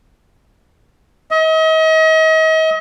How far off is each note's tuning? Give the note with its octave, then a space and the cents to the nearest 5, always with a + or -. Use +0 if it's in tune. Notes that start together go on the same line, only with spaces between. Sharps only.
D#5 +40